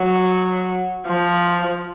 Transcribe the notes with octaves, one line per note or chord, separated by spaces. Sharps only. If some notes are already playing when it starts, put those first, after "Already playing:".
Already playing: F#3
F3